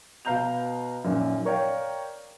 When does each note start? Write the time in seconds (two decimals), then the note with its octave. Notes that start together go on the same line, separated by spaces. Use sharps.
0.25 B2 B4 F5 A#5 G6 F7
1.04 F#2 A#2 D#3
1.45 A#4 C#5 D5 F5 G5